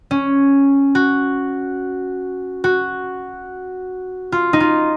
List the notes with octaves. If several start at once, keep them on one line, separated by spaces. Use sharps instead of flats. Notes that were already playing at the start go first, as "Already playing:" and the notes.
C#4
F#4
F#4
F4
D#4
F4